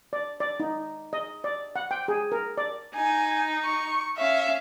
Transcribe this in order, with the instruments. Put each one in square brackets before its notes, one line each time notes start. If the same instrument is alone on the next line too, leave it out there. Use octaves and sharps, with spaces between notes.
[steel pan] D5
D5
D#4
D#5
D5
F#5
G5
G#4
A#4
D5
[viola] D#4 [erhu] G#5
[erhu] C#6
[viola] C#4 F5 [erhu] E5